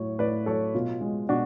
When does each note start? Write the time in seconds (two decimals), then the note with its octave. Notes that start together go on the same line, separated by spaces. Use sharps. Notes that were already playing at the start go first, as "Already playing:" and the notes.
Already playing: A2 F#3 C#5
0.19 A2 B4 D5
0.46 F#3 A4 C#5
0.75 B2 F4
1.01 G#3
1.29 B2 D4 F#4